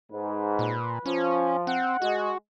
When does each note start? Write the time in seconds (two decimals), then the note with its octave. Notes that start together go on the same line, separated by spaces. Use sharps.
0.12 G#2 B4
0.59 A#2
1.06 F3 C#4
1.67 C4 F#5
2.02 G#3 F#4